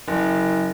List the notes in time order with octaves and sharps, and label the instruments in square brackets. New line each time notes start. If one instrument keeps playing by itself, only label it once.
[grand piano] F#1